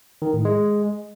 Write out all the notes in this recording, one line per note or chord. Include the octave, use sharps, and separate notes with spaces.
D#3
A2
G#3